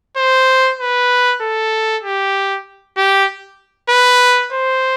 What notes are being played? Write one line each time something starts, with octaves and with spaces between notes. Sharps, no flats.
C5
B4
A4
G4
G4
B4
C5